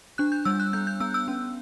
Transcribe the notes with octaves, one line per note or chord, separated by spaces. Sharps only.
D4 F#6
G6
G3 E6
F#6
B3 G6
G6
B3 E6
E6
C#4